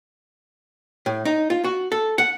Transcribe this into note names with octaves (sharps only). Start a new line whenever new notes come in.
A2
D#4
F4
F#4
A4
F#5